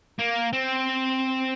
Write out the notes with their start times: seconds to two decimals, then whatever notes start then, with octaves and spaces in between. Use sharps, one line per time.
0.19 A#3
0.53 C4